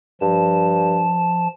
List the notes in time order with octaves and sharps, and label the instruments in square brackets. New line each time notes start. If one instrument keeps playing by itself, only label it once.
[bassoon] G2 [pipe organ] F3 A5